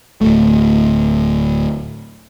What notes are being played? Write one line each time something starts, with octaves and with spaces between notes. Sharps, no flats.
D1 G1 A3